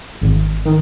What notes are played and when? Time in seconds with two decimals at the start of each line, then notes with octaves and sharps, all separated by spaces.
0.22 G#1
0.65 D#3